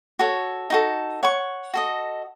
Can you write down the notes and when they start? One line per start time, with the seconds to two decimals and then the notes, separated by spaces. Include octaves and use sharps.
0.19 F#4 A4 C#5
0.70 D#4 F#4 A4
1.23 C#5 F#5 C#6
1.74 F#4 A4 D#5